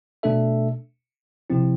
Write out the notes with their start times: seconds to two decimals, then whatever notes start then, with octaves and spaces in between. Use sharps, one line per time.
0.23 B2 A3 D4 A4 E5
1.50 C3 F3 C4 E4